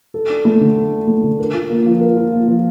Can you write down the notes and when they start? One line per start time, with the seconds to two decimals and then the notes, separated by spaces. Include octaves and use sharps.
0.14 A4
0.30 D4
0.45 A3
0.61 D3
0.76 A4
0.92 D4
1.08 A3
1.24 D3
1.39 A#4
1.54 F4
1.70 A#3
1.86 F3
2.01 A#4
2.17 F4
2.32 A#3
2.48 F3